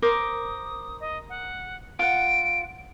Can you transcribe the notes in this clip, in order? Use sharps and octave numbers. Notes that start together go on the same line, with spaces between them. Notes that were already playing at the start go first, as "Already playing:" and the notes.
A#4 C5 D6 D#6
D#5
F#5
F4 F#5 D7